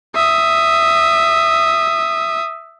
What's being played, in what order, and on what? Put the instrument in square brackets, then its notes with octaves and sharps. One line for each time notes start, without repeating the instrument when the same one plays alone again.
[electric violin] E5 D#6